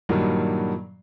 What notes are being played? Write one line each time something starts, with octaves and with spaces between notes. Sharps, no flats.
G2 A#2 D#3 F#3 G3